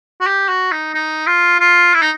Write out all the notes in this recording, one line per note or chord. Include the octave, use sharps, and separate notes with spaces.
F#4
G4
F#4
D#4
D#4
F4
F4
E4
D#4